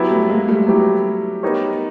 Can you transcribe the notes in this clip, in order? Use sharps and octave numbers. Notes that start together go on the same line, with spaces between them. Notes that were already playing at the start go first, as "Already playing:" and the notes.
Already playing: F#3 B3 E4 G4
G3 A3
G#3 A#3
G3 A3
F#3 B3 E4 G4
B3 D#4 G4 A#4 C#5